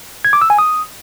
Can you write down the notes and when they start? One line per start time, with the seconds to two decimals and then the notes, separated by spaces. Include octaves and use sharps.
0.25 G#6
0.33 D6
0.42 E6
0.50 G#5
0.58 D#6